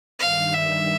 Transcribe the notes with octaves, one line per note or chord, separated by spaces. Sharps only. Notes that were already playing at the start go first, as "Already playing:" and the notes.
G2 D#3 G3 F5
E5